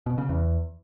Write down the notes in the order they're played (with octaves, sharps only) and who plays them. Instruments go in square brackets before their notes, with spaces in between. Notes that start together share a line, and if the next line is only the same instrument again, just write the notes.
[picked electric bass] B2
C#3
E2